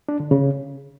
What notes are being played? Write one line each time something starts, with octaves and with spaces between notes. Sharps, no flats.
D4
D3
C#3